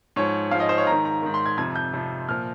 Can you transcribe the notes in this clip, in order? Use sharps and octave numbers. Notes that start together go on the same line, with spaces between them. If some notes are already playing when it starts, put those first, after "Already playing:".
G#2 F3 C#5
G#2 F3 F5
D#5
C5
C#5
G#2 D#3 A#5
A#5
G#2 D#3
C6
G#6
F2 C3 F3 G#6
G6
F2 C3 F3
A#2 F3 F6